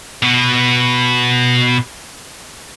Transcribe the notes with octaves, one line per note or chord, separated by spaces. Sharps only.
B2 B3